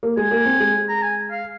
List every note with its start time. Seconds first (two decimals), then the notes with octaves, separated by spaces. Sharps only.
0.03 A#3
0.17 G#3 G#5
0.31 A#3
0.46 C4
0.60 G#3
0.88 A#5
1.02 G#5
1.31 F5